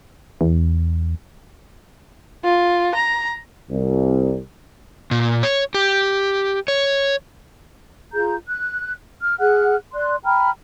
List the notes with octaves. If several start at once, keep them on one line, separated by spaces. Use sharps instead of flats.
E2
F4
A#5
C2
A#2
C#5
G4
C#5
F4 G#4 A#5 G6
F#6
F6
G#4 F#5 F6 F#6
D5 C6 F#6
G5 A#5 B5 F6